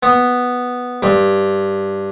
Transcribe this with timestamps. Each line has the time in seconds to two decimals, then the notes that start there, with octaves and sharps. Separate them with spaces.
0.03 B3
1.03 G2